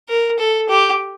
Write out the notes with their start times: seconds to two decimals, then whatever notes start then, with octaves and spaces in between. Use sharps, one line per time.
0.09 A#4
0.39 A4
0.69 G4